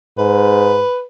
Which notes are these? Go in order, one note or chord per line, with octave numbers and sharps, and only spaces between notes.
G#2 B4